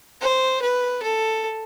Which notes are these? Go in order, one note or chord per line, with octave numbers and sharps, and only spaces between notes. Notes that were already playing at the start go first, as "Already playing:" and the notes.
C5
B4
A4